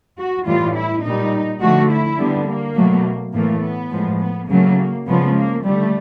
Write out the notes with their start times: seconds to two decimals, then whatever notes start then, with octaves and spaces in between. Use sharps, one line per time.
0.18 F#4
0.46 A2 E3 G3 F4
0.75 E4
1.04 A#2 G3 D#4
1.61 D3 F3 A3 F#4
1.90 E4
2.19 D3 G3 B3
2.48 A#3
2.76 B2 F#3 A3
3.34 A2 E3 A3 A#3
3.62 B3
3.91 A2 F3 G#3
4.20 B3
4.49 C#3 F#3 A3 A#3
5.06 C#3 F3 G#3 B3
5.35 A#3
5.64 D3 G3 A3